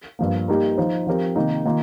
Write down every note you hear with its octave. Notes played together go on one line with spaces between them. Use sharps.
G2 F3 A#3
G3 A#3 D#4 G4 A#4
F3 D#4 C5
F3 C4 G4 A#4
C3 D#3 A#3 D#4 A#4
D#3 A#3 F4